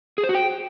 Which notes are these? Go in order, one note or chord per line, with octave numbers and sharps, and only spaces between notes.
G#4
C5
F#4
G5